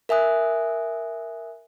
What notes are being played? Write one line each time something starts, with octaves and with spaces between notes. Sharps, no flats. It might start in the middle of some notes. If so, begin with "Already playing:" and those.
A#4 E5 G#5 D#6 F#6